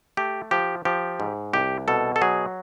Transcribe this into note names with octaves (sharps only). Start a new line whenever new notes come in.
A3 G4
F3 G4
F3 G4
G#2
C2 G4
B2 A4
A4
F#3 G#4